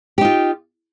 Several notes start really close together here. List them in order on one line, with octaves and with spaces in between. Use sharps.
G4 D#4 F4